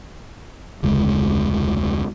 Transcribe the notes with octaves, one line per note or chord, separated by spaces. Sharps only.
F1 D2 C#3 G#3